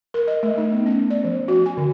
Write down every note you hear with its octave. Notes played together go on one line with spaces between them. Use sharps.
A#4
D#5
A3
D#4
B3
C#4
D5
F3
F#4
G#5
D3